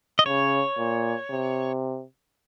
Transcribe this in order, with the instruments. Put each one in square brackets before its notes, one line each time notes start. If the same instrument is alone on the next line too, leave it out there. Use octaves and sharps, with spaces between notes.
[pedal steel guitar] D#5
[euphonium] C#3 [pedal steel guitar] C#5
[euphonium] A#2
C3